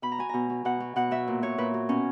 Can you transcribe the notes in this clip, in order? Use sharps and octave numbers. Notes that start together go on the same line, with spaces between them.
B2 B5
A#5
F#3 G#5
B2 A#5
F#3
B2 F#5
F#3
B2 F#5
F#3 E5
A#2
F#3 C#5
A#2 B4
F#3
B2 C#4